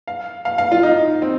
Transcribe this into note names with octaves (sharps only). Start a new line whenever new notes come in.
F5
F5
F5
F4
D#4
C4